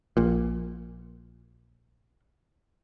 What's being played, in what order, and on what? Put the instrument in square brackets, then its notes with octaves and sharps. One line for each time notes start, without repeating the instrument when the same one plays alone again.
[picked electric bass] A#1 A#2